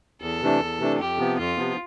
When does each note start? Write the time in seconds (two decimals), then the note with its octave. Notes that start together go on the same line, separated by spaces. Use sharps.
0.22 E2 A4
0.41 C3 E3 A3 D4
0.60 E2
0.80 C3 E3 A3 D4
0.99 F2 G4
1.18 C3 F3 B3
1.38 F2 F4
1.57 C3 F3 B3